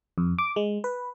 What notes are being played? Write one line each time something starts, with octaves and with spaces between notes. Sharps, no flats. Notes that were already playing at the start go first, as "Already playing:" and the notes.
F2
D6
G#3
B4